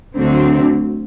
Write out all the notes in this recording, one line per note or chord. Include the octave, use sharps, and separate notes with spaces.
D2 D3 F#3 C4